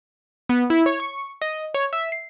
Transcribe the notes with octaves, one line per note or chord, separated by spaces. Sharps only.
B3
E4
C#5
C#6
D#5
C#5
E5
C7